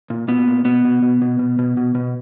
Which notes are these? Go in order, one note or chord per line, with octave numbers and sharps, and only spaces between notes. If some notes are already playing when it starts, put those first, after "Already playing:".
A#2
A#2 B3
A#2
B2 B3
B2
B2
B2
B2
B2
B2
B2